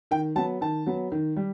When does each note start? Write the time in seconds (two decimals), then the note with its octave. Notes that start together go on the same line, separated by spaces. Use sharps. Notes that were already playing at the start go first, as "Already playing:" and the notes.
0.11 D#3 G5
0.35 F#3 B3 A5
0.61 D#3 A5
0.86 F#3 B3
1.12 D#3
1.36 G3